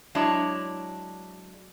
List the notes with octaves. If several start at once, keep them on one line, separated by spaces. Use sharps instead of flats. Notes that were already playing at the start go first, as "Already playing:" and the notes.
F#3 G#3 D4 E4 C#5